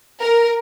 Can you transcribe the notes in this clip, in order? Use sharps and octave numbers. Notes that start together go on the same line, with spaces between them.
A#4